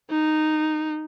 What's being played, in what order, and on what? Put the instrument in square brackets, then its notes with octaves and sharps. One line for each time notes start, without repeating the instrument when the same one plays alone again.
[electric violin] D#4